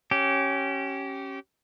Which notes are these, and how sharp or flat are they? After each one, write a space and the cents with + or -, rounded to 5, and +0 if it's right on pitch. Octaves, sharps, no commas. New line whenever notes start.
C#4 -10 G4 -25